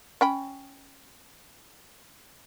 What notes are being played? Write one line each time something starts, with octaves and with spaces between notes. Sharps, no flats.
C#4 G5 B5